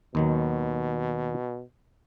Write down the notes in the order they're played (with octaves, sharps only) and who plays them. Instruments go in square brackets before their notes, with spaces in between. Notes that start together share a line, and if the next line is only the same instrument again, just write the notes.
[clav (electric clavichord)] D#2 D#3 F#3 [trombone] B2